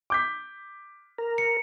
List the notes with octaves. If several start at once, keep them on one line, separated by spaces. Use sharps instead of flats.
D6 G6 B6
A#4
C#7